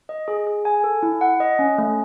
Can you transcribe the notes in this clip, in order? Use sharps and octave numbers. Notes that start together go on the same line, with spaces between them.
D#5
G#4
G#4
G#5
A4
E4
F#5
D#5
C#4
A3